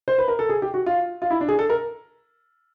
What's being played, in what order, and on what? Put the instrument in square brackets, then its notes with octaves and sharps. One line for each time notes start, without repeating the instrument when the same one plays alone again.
[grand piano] C5
B4
A#4
A4
G#4
G4
F#4
F4
F4
E4
D4
G#4
A4
A#4